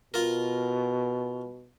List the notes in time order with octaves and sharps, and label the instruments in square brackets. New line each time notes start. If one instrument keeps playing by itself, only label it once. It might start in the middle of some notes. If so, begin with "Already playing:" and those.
[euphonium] B2 [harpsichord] F4 A#4